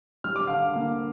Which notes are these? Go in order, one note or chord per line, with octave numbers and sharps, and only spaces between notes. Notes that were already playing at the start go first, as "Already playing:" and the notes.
G3 F6
D6
D3 F5 F6
A#3